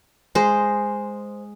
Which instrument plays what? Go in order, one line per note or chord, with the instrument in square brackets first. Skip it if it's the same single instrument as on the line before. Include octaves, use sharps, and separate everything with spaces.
[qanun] G#3 C5